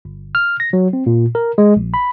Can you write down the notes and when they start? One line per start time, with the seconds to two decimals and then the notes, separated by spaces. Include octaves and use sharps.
0.05 G1
0.35 F6
0.60 A#6
0.73 F#3
0.93 C4
1.06 A#2
1.35 A#4
1.58 G#3
1.76 A#1
1.94 B5